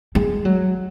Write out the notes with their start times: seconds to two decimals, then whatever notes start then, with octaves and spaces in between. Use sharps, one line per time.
0.15 G#3
0.45 F#3